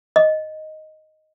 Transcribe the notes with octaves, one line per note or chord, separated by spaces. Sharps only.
D#5